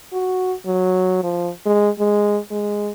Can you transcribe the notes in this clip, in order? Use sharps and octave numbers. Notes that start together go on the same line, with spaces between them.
F#4
F#3
F3
G#3
G#3
G#3